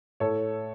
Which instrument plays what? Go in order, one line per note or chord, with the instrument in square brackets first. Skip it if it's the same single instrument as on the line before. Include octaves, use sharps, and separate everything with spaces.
[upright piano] A2 A4 C#5